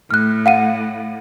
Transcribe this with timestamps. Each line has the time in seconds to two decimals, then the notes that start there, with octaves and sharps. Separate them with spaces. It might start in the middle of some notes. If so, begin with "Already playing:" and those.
0.11 A2 F6 F#6
0.46 F5 F#5 D#7